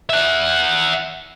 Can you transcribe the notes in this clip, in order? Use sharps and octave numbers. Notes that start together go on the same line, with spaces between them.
E5 F#5